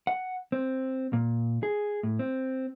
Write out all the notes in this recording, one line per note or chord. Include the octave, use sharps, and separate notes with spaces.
F#5
C4
A#2
G#4
A2
C4